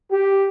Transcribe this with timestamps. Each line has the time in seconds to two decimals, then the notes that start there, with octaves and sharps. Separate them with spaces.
0.12 G4